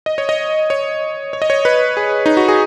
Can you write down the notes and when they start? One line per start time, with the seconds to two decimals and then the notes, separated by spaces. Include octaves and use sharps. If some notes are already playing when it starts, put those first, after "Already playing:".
0.06 D#5
0.18 C#5
0.29 D#5
0.70 C#5
1.33 C#5
1.42 D#5
1.50 C#5
1.65 B4
1.97 G#4
2.26 D#4
2.37 F#4
2.48 G#4